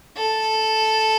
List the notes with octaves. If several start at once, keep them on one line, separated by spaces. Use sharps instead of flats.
A4